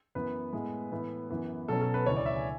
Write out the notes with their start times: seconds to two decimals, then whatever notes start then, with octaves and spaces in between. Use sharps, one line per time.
0.15 F#2 E3 B3 B4
0.53 A2 G#3 B3
0.91 A2 E3 B3
1.30 F#2 E3 B3
1.68 B2 F#3 C#4 A4
1.81 A4
1.94 B4
2.06 D2 C#3 E3 C#5
2.17 D5
2.26 E5
2.36 G#5